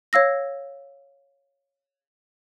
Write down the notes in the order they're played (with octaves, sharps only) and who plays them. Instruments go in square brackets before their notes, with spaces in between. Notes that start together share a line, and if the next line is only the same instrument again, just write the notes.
[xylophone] C#5 F5 E6 A#6